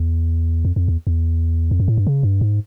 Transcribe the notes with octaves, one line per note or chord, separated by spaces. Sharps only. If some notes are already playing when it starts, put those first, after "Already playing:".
Already playing: E2
F2
F2
E2
E2
F2
F#2
A2
G2
C#3
G2
G#2